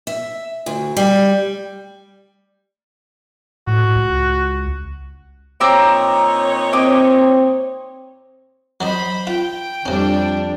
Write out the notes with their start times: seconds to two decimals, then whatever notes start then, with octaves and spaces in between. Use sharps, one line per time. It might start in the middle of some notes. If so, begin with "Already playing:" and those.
0.07 E5
0.66 D2
0.97 G3
3.67 A2 F#4
3.95 C#2
5.60 A#2 C4 D#4 C#5 A#5 D6
6.73 C4 D#5 D6
8.81 F#3 C5 D5 D#5 B5
9.27 F4 G5
9.86 F2 C3 G3 C#4 D4